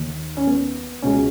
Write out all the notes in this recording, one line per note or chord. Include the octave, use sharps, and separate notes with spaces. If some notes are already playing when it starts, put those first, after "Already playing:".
Already playing: D#2 D#3
C#4
B3
C#2 B2 C#4